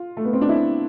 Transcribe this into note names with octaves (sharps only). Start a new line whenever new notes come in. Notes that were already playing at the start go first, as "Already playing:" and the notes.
Already playing: F4
A3
B3
C4
D4
E4